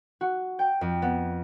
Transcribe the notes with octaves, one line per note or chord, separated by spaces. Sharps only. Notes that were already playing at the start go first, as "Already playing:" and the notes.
F#4
G5
F2
B3